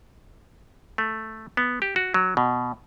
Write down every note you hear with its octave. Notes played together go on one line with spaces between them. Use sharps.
A3
B3
G4
F#4
F#3
B2